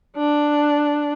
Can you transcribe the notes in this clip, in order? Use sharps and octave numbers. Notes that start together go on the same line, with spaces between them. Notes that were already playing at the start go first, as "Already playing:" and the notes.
D4